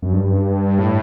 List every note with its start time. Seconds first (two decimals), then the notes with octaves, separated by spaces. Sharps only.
0.02 F#2
0.13 G2
0.78 A2